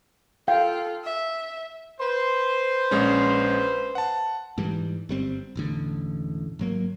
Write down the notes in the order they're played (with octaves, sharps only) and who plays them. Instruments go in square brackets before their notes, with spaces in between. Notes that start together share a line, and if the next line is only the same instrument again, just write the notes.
[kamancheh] F4 A4 [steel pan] F5 G5
[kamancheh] E5
[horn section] B4 C5
[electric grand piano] A#1 G#3 C#4
F#5 A5
[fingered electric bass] G#2 E3 G3
G1 G3 C4
E1 A1 D3
G#1 F#3 A#3